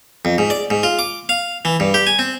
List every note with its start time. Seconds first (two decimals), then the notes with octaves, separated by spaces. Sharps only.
0.25 F2
0.38 G#2
0.50 D5
0.70 G#2
0.83 F4
0.99 D6
1.29 F5
1.65 E3
1.80 G2
1.94 G4
2.07 G#5
2.19 C4